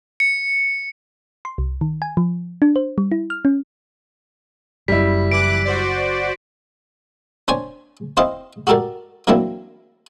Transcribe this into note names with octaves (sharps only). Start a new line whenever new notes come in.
C#7
C6
C2
D#3
G#5
F3
D4
C5
G3
E4
F6
C#4
F#1 F#2 G3 E4 B6
E3 D6 F#6 D7
F#4 C5 D5
D4 C5 C#5 G#5
C4 E4 C5 D#5 F5
F#4 G4 A4 A#4 D5
E3 F#3 A#3 C4 D4 E4